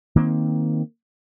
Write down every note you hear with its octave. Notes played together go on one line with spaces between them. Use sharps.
D#3 A#3 C4